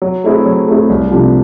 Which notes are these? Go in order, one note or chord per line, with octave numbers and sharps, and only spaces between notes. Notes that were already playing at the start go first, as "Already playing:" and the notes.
F#3
A3 C4 E4 G#4
F#3
A3 C4 E4 G#4
C2
C3 F3 A3 D4